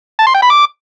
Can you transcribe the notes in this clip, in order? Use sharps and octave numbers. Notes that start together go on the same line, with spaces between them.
A5
C6
G5
B5
D6